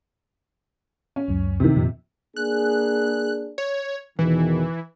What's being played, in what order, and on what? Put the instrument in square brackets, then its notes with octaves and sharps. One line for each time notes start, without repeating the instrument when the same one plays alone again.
[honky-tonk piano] C#4
[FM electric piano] C#2 F#2
[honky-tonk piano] C3 D#3
[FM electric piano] F2 A#2 F3
[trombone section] A#3 D4 G#4 [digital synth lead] F#6
[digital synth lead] C#5
[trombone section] E2 B2 D#3 [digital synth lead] E3